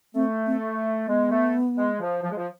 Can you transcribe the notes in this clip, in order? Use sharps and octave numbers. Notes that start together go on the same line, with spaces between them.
A3 C4
C4
G#3 B3
A3
G#3
F3
F3
G#3
F3